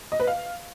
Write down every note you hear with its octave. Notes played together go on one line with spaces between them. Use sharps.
D#5
B4
F5